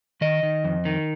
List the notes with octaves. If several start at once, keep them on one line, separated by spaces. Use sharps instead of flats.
D#3 D#5
D#3
F2
D#3